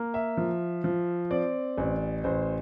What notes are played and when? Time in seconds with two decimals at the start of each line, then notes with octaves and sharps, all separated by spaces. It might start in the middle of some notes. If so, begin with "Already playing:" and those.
Already playing: A#3
0.14 E5
0.37 F3
0.84 F3
1.31 C4 D5
1.78 A1
2.24 A1 C5